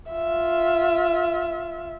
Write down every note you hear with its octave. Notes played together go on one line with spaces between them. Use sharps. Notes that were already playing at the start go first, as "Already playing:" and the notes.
F4 E5